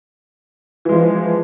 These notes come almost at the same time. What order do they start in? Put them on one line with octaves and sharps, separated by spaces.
E3 G#3 F3